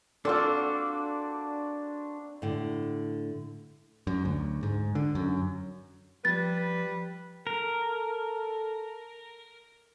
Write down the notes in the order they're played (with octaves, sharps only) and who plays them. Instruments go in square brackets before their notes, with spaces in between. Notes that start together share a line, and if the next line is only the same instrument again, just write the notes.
[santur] A#3 C4 D5 [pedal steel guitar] D4 F#4 [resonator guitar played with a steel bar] F4 A4
[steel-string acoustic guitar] A2 D3
[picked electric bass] F#2
D2
G#2
D3
F#2
[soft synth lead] F3 [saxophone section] G3 B4 [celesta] A6
[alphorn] A4 [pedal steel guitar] A#4